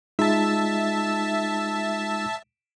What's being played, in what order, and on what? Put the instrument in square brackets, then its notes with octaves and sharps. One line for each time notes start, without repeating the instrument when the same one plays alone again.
[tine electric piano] G#3 D#4 F4 [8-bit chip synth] E5 A5